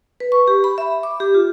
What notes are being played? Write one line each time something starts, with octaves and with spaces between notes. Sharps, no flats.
B4
C#6
G4
B5
E5
D6
G4
F4